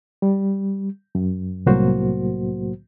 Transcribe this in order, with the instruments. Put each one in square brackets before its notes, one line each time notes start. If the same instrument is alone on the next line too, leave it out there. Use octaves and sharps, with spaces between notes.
[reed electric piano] G3
F#2
C2 A2 F#3 A#3 F#4 C5